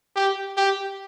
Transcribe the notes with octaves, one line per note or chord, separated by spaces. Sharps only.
G4
G4